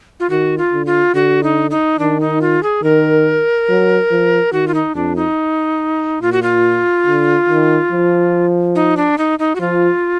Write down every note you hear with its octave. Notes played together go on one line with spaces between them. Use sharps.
F4
D#3 F#4
F4
D3
F4
D3 F#4
D#4
D#4
D#3 D4
D#4
F4
G#4
D#3 A#4
F#3
F3
D#3 F#4
F4
D#4
F2 D4
D#4
A#2 F4
F#4
F4
D3
D#3
F3
D#4
D4
D#4
D#4
F#4
F3 F4